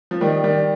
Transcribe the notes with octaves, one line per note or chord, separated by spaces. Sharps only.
F3
D#3 G3
D#3 G3